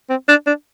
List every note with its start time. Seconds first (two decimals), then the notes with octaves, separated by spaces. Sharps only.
0.10 C4
0.29 D4
0.47 D4